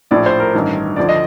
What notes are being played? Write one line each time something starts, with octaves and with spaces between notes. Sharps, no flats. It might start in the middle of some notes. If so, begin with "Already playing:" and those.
A#1 A2 F3 D5
C5
A#4
A1 G2 D#3
D2 D3 F3 D5
D#5